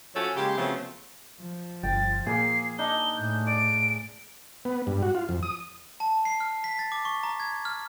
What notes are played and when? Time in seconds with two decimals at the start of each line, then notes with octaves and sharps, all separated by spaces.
0.15 F3 C#4 F#4 A4 C#5
0.36 C#3 G#3 A#3 G4
0.58 C#3 F3 F#3 A3 B3 C4
1.41 F3
1.83 G1 G5 A6
2.27 A#2 A#3 G#4 C7
2.79 D4 D#4 G7
3.17 A2 G6
3.47 D5 D7
4.65 B3
4.87 G2
5.03 F#4
5.15 F4
5.29 F2
5.43 D#6
6.00 A5
6.25 C7
6.40 F6
6.64 B6
6.79 A6
6.92 D6
7.05 C#6
7.23 A#5
7.40 G#6
7.65 F6